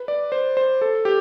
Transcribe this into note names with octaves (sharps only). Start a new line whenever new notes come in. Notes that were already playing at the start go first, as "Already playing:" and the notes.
Already playing: B4
D5
C5
C5
A4
G4